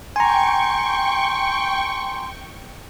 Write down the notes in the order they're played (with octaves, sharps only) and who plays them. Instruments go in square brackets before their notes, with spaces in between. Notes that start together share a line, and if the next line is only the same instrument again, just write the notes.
[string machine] G5 C#6 [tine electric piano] G#5 A#5 [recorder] C6